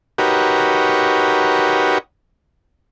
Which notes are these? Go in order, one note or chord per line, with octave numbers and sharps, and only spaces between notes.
D#4 F#4 G4 A#4 B4 C#5